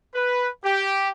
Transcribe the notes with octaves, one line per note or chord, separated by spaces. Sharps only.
B4
G4